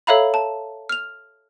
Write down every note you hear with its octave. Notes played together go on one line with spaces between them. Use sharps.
A4 C#5 E5 F5 A#5 B5
A5
F6 F7